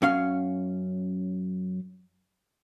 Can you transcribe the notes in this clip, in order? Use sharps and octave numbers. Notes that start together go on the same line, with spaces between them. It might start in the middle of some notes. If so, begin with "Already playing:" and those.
F#2 C#4 F5